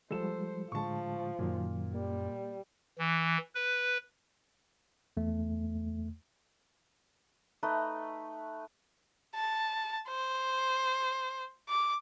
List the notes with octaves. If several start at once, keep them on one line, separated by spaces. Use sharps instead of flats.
F3 G3 G#3 A4 C5 E7
A2 D3 F3 G#3 A5 C#6
F#2 A#2 D#3 F#3
G3 A#3
E3
B4
E2 A3
A3 D#4 B4
A5
C5
D6